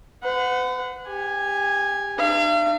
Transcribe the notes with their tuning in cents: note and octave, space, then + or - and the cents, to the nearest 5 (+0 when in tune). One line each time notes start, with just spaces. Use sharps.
B4 +45 F#5 -10
G4 +25 G#5 -5
D4 +45 F5 -45